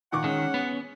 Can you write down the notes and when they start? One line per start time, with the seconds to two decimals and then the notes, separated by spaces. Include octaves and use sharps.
0.12 A#2 D#3 F#5 C#6 D6
0.24 D#3 G#3 C#4
0.54 B3